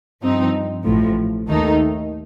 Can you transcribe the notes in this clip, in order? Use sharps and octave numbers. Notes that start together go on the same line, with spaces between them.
G2 F3 C4 D#4
A1 A2 F3
D#2 D#3 A3 D#4